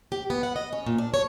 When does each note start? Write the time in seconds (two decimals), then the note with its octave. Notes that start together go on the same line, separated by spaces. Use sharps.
0.12 G4
0.30 B3
0.43 F#5
0.56 D#5
0.73 C#4
0.87 A#2
0.98 D4
1.14 C#5